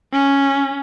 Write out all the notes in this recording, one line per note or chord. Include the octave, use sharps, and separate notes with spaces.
C#4